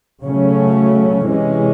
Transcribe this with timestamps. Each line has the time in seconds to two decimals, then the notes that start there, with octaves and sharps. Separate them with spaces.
0.24 C#3 F#3 A3 C#4
1.26 C3 E3 G#3 C#4